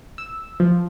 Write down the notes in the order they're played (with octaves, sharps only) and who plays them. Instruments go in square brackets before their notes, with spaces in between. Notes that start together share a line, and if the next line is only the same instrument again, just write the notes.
[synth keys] E6
F3